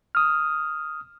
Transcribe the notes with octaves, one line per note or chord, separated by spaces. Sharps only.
D#6 F6